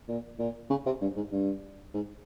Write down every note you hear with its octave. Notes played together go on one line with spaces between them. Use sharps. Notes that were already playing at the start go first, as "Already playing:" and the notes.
A#2
A#2
C#3
C3
G2
G#2
G2
G#2